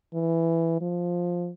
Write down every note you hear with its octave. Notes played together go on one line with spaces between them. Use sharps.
E3
F3